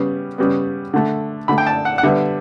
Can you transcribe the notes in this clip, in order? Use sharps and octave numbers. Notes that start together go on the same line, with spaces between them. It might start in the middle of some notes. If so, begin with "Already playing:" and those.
Already playing: C#3 G3 B3
C#3 G3 B3
D3 A3
D3 A3 B5
G5
A5
F#5
F#5
D3 G3 B3 E5